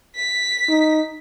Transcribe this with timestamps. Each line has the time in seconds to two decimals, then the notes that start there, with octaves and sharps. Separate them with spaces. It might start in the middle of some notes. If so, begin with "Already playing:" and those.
0.15 B6
0.69 D#4